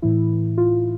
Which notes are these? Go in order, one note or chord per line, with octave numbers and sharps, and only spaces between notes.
A2 E3 E4
F4